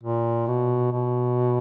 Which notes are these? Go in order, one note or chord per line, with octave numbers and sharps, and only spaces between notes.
A#2
B2
B2